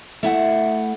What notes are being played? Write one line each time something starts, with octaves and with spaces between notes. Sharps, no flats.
A3 E4 F#5